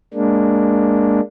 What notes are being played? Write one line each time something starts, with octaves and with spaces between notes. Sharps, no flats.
G#3 A#3 D4